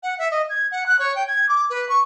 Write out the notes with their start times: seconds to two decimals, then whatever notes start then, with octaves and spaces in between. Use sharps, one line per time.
0.03 F#5
0.18 E5
0.31 D#5
0.49 G#6
0.71 F#5
0.86 F#6
0.99 C#5
1.15 G5
1.27 G#6
1.48 D6
1.70 B4
1.89 C#6